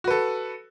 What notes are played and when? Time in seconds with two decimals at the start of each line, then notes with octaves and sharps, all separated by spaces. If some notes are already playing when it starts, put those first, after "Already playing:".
0.04 F#4
0.07 B4
0.11 A4